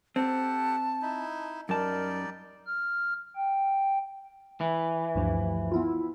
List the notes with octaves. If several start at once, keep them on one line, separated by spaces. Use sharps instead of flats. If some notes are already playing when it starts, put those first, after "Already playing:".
C4 G4 A4 F#5 A5
D#4 E4
F#2 G3 D#4 A#4 D5 A5
F6
G5
E3
D2 G2 F3
B3 E4 F4